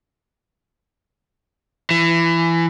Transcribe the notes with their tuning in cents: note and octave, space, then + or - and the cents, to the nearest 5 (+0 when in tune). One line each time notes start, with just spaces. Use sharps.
E3 +20